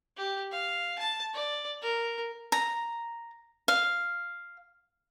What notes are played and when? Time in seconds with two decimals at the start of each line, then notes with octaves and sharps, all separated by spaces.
0.17 G4
0.51 F5
0.98 A5
1.34 D5
1.82 A#4
2.52 A#5
3.68 F5